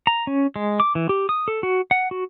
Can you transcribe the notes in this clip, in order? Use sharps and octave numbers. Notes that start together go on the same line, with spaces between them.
A#5
C#4
G#3
D6
E3
G4
D#6
A4
F#4
F#5
F#4